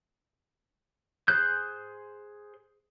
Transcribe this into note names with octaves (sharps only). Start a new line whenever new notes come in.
G#4 C5 F#6 G6